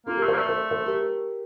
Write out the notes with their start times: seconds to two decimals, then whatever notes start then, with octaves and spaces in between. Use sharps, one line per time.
0.06 A#3 F4 A4
0.17 G4 A#4
0.23 A3
0.28 C5
0.34 A#3
0.38 A3 D5
0.49 A4 C5
0.70 A4 C5
0.86 G4 A#4